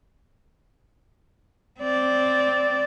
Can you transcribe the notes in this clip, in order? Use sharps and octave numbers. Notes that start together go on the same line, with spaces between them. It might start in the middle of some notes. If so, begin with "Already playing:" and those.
C4 D5